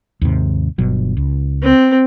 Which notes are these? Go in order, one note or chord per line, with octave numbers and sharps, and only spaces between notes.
D#2 G#2 C3
G1 B2 F#3
C#2
C4